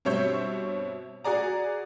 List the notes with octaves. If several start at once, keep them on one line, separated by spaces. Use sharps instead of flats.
G2 B2 C4 C#5 E5 G6
F#4 G#4 D5 A#5